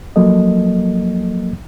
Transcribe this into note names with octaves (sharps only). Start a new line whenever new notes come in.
F3 F#3 A#3 A4 D#5